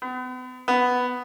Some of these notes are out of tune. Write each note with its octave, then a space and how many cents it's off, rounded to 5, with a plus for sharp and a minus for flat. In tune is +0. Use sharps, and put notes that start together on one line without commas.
B3 +40
B3 +5